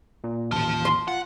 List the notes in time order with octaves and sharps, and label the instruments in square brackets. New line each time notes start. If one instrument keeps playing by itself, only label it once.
[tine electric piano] A#2
[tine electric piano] A1 D#2 [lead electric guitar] F4 A5
[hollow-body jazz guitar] C6
[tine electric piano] F4 [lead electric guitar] F#5